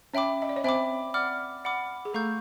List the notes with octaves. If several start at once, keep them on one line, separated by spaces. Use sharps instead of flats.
C#4 C#5 E5 G5 B5 D6
D#5
D5
C#5
C4 C5 E5 G5 B5 D6
D5 F#5 B5 D6 F6
D5 F#5 B5 D6 F6
G#4
A3 A4 F5 A#5 C#6 E6 G6